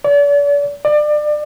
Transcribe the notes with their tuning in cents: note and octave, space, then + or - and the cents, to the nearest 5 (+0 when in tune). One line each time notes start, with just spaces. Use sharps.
D5 -40
D5 +30